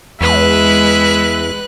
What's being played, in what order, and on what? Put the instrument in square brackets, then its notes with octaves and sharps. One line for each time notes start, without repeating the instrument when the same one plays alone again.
[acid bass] E2 [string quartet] G#3 [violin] B4 F#6 [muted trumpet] E5